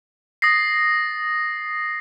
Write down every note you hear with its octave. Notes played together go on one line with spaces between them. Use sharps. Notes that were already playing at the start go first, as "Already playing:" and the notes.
D#6 A6 A#6 C7